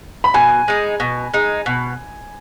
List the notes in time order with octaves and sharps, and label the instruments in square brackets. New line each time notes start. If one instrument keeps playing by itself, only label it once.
[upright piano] B5
[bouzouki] B2 [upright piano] G#5
[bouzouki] G#3 D#4
B2
G#3 D#4
B2